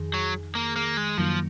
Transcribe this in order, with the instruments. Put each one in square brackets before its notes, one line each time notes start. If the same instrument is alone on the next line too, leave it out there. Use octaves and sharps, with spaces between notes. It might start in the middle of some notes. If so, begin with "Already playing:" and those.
Already playing: [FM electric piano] F2 D#3 G#4
[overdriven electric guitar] F#3
A#3
A#3
G#3
[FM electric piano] F#2 D#3 F#3 A#3 [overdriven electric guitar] F3